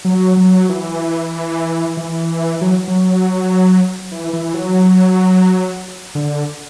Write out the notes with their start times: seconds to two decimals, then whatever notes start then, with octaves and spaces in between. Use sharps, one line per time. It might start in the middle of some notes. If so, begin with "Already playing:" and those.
0.05 F#3
0.37 F#3
0.69 E3
1.97 E3
2.61 F#3
2.88 F#3
4.12 E3
4.33 E3
4.54 F#3
6.15 D3